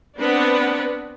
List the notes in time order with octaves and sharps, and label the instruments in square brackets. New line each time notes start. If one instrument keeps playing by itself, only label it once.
[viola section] B3 C4 D4 B4 F#5